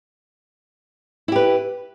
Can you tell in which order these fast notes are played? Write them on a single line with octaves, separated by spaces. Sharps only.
E4 G4 B4